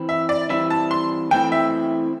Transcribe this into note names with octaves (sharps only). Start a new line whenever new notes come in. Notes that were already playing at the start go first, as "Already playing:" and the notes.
Already playing: E3 C4 E4
E5
D5
E3 G3 C4 E4 E5
A5
C6
E3 A3 C4 E4 G5
E5